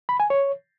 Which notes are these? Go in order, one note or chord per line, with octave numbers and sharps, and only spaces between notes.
B5
G#5
C#5